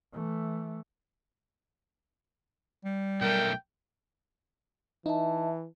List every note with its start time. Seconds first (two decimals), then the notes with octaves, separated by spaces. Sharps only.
0.12 E3 A3
2.85 G3
3.21 B1 A3 A#4 G5
5.06 E3 D#4 E5 A5